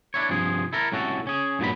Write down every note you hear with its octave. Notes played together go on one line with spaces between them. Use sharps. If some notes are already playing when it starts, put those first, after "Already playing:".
D4 E4 C#5
C2 G2 F3 G#4
E4 A4 A#4
C2 A2 C#4 F#4 A4
C#4 G#4
G2 A#2 F3 F#3 G#3 B5